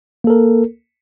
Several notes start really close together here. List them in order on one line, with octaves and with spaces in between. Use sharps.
A#3 A4 A#4